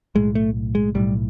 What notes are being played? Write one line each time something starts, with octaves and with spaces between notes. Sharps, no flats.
B1 A2 G#3
A3
G#3
B1 A2 G3